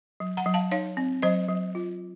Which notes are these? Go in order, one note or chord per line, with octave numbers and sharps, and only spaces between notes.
F#3
F#5 A#5
F#3
F5 A5
D#4 C#5 F5
C4
F#3 C5 D#5
F#3
F4